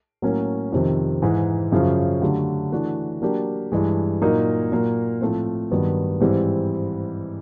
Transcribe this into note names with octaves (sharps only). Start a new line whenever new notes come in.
A2 F#3 A#3 C#4
F2 C3 D#3
G#2 E3 G#3
F#2 C#3 F3
D3 F#3 A3 D4 G4
E3 A3 D4 F#4
F#3 A#3 D4 G4
G2 E3 G#3
A#2 F#3 A#3 D#4
A#2 F#3 A#3
A2 F3 A3 C4
G2 D#3 F#3 B3
G#2 E3 G3 C4